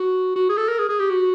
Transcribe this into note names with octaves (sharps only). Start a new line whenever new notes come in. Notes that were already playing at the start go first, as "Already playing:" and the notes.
Already playing: F#4
F#4
G#4
A4
A#4
G#4
G#4
G4
F#4